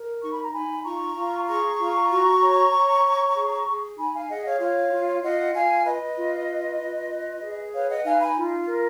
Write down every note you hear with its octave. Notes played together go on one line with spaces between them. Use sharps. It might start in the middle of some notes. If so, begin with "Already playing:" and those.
Already playing: A#4
D#4 C#6
B5
A#5
D#4 G#5 B5
F4 A#5 C#6
F4
G#4 A#5 C#6
F4
F#4
C#5
C#5
C#5
G#4
G#4
D#4 G#5 B5
F5 G#5
G#4 D#5 F#5
C#5 F5
F4 C#5 F5
F4
F4 D#5 F#5
F4 F5 G#5
B4 D#5
F4
B4
F4
B4
G#4
B4 C#5 F5
D#5 F#5
D#4 F5 G#5
G#5 B5
F4
A#4